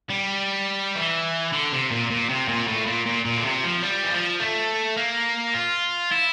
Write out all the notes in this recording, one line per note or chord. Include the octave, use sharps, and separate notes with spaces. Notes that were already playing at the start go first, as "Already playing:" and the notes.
G3
E3
D3
C3
A#2
A#2
C3
A#2
A2
A#2
A#2
A#2
D3
C3
F3
G3
E3
F3
A3
A#3
F4
E4